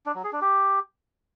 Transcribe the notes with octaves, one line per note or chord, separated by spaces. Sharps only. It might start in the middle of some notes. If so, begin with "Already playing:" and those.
D4
F#3
G#4
D4
G4